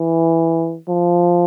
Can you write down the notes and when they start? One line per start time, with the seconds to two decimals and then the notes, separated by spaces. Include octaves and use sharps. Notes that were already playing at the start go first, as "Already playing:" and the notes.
Already playing: E3
0.89 F3